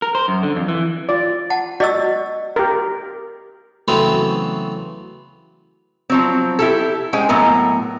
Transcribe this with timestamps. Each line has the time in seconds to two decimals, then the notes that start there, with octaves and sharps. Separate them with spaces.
0.02 A#4
0.15 C5
0.28 F#2
0.43 D3
0.56 F2
0.68 E3
1.09 F4 D5
1.50 F#5 A5
1.80 F#4 D5 D#5 E6
2.56 G4 A#4
3.88 C#3 E3 F#3 A3 B3 C4
6.10 F3 F#3 C4
6.59 E4 G4 A4
7.13 G#3 C#4 C5 G5 G#5
7.29 A2 F#3 B3 A#4